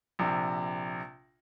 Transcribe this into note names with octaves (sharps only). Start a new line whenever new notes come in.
A#1 C3